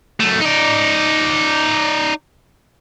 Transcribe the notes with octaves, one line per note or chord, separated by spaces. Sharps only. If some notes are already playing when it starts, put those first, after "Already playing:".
F#2 A3
D#4 D5